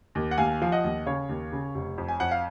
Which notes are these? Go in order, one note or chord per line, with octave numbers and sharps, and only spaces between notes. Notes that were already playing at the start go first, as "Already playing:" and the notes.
D#2
F#5
D#2 F5 G#5
F3 F5
D#5 F#5
D#2
C#3 C#5 F5
D#2
C#3
F1
F2
G#5
F2 F#5
F5